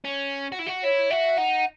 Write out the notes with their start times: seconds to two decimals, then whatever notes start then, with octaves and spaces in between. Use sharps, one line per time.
0.04 C#4
0.52 F#4
0.59 E4
0.67 F#4
0.84 E4 C#5
1.11 F#4 E5
1.38 D#4 F#5